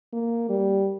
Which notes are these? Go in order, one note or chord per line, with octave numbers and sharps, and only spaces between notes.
A#3
G3